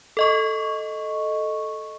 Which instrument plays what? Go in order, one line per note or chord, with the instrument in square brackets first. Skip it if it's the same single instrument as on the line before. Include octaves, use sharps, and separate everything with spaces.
[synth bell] A4 D#5 C#6